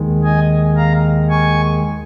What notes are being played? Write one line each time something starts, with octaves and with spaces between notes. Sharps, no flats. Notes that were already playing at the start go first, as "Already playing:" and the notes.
Already playing: D#2 D#3 G#3
D#5 G#5
F5 A#5
G#5 C#6